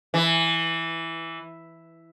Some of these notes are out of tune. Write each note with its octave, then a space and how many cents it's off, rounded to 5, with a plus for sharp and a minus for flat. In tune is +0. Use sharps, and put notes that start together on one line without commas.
E3 +0